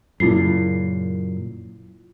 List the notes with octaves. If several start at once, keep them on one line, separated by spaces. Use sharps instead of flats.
F#2 A#2 C#3 E4 F4 C7